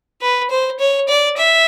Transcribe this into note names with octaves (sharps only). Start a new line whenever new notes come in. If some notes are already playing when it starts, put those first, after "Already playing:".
B4
C5
C#5
D5
E5